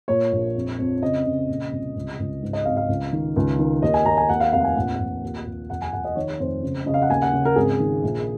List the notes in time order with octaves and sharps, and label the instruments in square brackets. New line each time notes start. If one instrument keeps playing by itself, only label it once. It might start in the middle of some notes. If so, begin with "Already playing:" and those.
[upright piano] A#2 C#5
A#1
F2
F2
C#3 D#5
C#3
A#2
C2
C#2
C#2
G#2
D#5
G#1 F5
F5
C#2
D#3
C#2
D#3
D#2 D#5
G#5
D#2 A#5
G#5
D#2 F#5
F5
F1 F5
F#5
G#5
A#1 F#5
A#1
D#2
D#2
F1 F#5
G#5
F1 F#5
D#5
D#3 C#5
F1 C5
C#3
C#3 D#5
F5
F#5
D#2 G#5
F#5
C#3
A#4
G#1 G#4
D#3
A#1